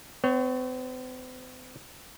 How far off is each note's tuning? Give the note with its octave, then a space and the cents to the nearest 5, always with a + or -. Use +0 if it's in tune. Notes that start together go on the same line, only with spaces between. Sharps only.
C4 -45 C#5 +0